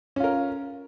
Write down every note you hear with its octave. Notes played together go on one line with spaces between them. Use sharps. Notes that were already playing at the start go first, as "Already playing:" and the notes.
C#4 F4 A#4